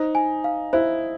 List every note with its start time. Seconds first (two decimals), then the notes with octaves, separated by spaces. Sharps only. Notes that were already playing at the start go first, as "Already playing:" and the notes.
Already playing: D#4 C5
0.15 G#5
0.44 F5
0.73 E4 C5